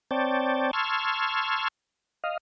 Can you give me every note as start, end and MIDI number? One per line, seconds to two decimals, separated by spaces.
0.11 0.71 60
0.11 0.71 73
0.11 0.71 74
0.11 0.71 79
0.11 0.71 81
0.73 1.68 81
0.73 1.68 84
0.73 1.68 85
0.73 1.68 88
0.73 1.68 89
0.73 1.68 92
2.24 2.37 75
2.24 2.37 77